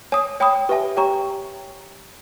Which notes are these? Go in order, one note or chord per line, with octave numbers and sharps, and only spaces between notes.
C#5 G#5 D#6
C#5 G5 B5 D#6
G4 B4 E5 G#5
G4 C#5 G5 A#5 C#6